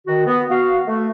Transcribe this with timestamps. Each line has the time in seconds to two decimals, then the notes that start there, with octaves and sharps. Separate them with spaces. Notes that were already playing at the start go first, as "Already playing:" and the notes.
0.07 D#3 F#4
0.27 B3
0.50 F#4 F5
0.87 A3